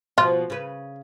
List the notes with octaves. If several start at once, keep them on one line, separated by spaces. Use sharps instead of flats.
B2 F3 B3 F4
C#3 B4